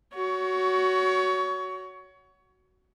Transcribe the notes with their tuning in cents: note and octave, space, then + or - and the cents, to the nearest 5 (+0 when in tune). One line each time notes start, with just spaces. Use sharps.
F#4 +10 C#5 +25